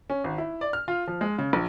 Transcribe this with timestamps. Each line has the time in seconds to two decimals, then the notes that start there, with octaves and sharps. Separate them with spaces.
0.10 C#4
0.24 G#1
0.38 E4
0.61 D5
0.73 F6
0.88 F4
1.07 F3
1.21 G#3
1.38 C#3
1.53 A#1